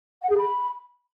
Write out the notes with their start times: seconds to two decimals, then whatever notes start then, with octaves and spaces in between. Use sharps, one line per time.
0.22 F#5
0.29 G#4
0.37 B5